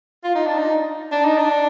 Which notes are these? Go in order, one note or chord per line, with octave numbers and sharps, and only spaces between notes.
F4
D#4
D4
D#4
D4
D#4
D4